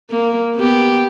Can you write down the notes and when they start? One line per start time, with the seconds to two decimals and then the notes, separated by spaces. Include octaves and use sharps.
0.10 A#3
0.56 B3 G4